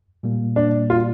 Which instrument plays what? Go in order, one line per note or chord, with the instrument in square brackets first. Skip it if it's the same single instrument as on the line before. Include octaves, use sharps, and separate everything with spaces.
[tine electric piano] A#2 G3 A#3
[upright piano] D4
F4